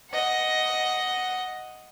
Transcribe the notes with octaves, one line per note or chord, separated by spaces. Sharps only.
D#5 F#5